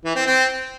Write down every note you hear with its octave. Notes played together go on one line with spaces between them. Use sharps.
E3
C4
C4